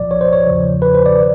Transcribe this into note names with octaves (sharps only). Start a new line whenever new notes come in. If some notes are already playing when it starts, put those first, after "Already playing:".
Already playing: C2 A#2 F3 D5
C#5
C5
C#5
E2 C#3 F3
B4
C5
D5
D#3